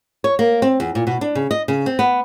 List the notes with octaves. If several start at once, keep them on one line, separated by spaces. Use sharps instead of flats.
C#5
A#3
C4
E2
A#2
B2
D4
C#3
D#5
C#3
C4
B3